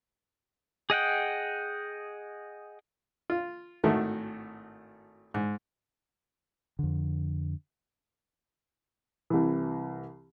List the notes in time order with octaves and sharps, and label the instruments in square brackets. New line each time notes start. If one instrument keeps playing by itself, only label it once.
[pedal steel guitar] G#4 D#5 F#5 G5
[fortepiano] F4
G#1 A2 D#3 A3 F#4
G#2
[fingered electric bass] F2 D3
[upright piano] C2 E3